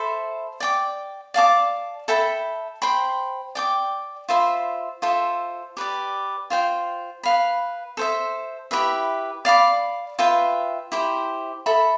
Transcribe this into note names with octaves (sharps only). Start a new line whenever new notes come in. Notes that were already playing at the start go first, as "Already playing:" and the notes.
Already playing: A4 C5 E5 B5
D5 G5 D6
D5 F5 A5 D6
A4 E5 G5 B5
C5 G5 B5
D5 G5 D6
F4 C5 E5 B5
F4 A4 C5 E5
G4 B4 D5
F4 C5 G5
B4 F5 B5
A4 C5 E5
E4 G4 B4 E5
D5 F5 B5 D6
F4 B4 E5 G5
E4 G4 C5
A4 E5 B5